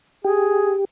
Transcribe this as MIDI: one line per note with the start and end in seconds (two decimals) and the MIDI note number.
0.25 0.85 67
0.25 0.75 68